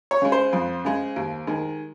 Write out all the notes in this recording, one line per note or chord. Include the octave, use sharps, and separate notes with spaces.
C#5
C#3 G#3
C5
F2
C#3 G#3
D#2
D#3 G#3